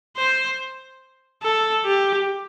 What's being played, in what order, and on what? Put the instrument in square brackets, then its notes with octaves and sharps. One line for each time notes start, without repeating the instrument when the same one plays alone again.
[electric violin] C5
A4
G4